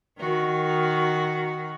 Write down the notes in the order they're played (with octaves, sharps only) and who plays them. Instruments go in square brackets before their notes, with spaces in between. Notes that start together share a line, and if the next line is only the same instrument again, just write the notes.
[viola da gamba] D#3 F#4